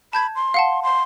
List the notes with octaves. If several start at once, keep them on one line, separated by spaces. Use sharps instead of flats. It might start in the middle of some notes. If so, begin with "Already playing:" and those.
A5 B5 G6 G#6
C6
F5 F#5 A5
C6